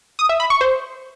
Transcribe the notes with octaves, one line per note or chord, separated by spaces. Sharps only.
D#6
E5
B5
C#6
C5